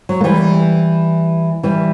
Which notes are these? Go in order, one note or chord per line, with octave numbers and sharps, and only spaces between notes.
F#3
A#3
E3 G3
E3 G3